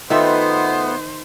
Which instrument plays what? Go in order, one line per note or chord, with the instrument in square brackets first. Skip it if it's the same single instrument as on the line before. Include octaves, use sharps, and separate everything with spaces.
[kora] D#3 D#4 [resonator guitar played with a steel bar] A3 F4 E5 [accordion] B3 [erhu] C5